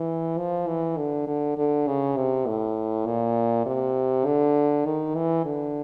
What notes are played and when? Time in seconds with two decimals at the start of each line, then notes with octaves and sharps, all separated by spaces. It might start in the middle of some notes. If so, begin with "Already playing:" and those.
Already playing: E3
0.38 F3
0.68 E3
0.98 D3
1.27 D3
1.57 D3
1.87 C#3
2.17 C3
2.47 A2
3.06 A#2
3.66 C3
4.25 D3
4.86 D#3
5.15 E3
5.45 D3